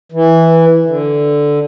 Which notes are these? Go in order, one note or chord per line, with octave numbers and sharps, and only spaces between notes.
E3
D3